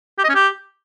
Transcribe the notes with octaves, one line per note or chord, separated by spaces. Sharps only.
G4
D#5
C#4
G4